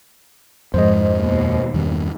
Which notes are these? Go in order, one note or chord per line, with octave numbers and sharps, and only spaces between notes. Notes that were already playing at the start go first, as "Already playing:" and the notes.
F2 G#2 F3 G#3 C5 D#5
D#2 B2
E2 G2 D#3